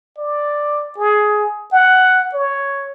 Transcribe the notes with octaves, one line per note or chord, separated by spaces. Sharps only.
D5
G#4
F#5
C#5